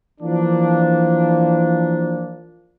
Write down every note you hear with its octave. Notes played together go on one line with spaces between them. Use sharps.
E3 F3 A#3 D4